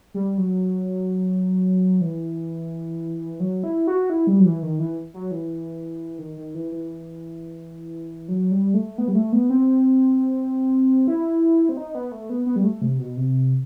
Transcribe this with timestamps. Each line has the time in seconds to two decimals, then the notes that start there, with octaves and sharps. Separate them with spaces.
0.14 G3
0.38 F#3
2.01 E3
3.40 F#3
3.64 E4
3.87 F#4
4.10 E4
4.27 G3
4.40 F#3
4.45 E3
4.63 D#3
4.79 E3
5.14 F#3
5.31 E3
6.19 D#3
6.37 D#3
6.55 E3
6.72 E3
8.28 F#3
8.51 G3
8.74 A3
8.98 B3
9.08 G3
9.15 A3
9.33 B3
9.50 C4
11.07 E4
11.69 C4
11.77 D#4
11.95 B3
12.12 A3
12.30 B3
12.46 B3
12.56 G3
12.64 A3
12.82 C3
12.98 B2
13.17 C3